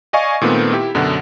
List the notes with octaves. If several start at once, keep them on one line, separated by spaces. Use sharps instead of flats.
D5 D#5 F5 G#5 C#6
A#2 D#3 A3 B3 C4
E4 G4
F#2 B2 D3 F#3